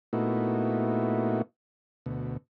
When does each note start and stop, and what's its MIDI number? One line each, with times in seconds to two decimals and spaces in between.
0.13 1.42 46
0.13 1.42 57
0.13 1.42 59
0.13 1.42 63
0.13 1.42 64
0.13 1.42 66
2.06 2.37 38
2.06 2.37 47